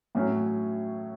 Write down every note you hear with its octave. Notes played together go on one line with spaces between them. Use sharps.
A2 F#3 C#4